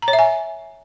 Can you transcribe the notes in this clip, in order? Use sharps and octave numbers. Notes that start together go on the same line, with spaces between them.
A#5
C#5
E5
G#5